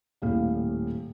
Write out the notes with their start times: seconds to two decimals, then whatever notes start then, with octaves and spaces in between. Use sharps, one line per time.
0.22 D#1 A2 F5